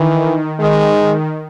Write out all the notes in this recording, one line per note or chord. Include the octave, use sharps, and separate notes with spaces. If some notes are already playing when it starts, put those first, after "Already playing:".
Already playing: D#3 E3
D#3 G#3